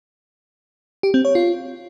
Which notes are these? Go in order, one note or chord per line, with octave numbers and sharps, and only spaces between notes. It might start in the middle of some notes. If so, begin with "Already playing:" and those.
G4
C4
C#5
F4